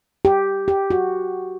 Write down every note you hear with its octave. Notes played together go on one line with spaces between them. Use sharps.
G4
G4
F#4